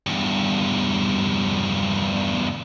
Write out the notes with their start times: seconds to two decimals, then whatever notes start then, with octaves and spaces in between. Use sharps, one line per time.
0.07 E2 G2